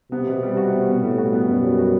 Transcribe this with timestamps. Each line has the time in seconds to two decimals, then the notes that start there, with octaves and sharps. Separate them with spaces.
0.11 C3 B3
0.27 B2
0.43 G3
0.57 F#4
0.72 B3
0.87 B2
1.02 A2 G3
1.18 F#4
1.33 B3
1.48 F#2 B2
1.63 G3
1.78 F#4